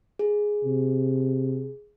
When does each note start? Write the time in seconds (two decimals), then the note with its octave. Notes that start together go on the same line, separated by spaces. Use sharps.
0.19 G#4
0.65 C3